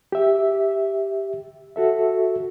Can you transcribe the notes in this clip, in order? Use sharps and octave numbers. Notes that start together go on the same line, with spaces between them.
G4 E5
F#4 A4 E5